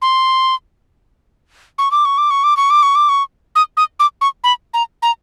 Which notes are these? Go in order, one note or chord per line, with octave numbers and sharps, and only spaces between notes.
C6
C#6
D6
C#6
D6
C#6
D6
C#6
D6
C#6
D6
C#6
D#6
D#6
D6
C#6
B5
A#5
A#5